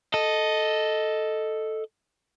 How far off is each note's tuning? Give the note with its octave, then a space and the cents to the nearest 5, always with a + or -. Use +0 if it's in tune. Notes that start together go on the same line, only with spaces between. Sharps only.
A4 +0 D#5 +0